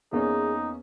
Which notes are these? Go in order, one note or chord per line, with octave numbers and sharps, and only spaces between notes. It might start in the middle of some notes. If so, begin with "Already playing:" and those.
E2 A#3 C#4 D#4 G#4